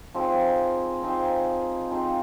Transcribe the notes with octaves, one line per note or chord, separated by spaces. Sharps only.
F3 C4 D#4 G#4
F3 C4 D#4 G#4
F3 C4 D#4 G#4